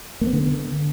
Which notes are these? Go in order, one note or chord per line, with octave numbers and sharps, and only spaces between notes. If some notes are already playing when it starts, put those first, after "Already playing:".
A#3
B3
D3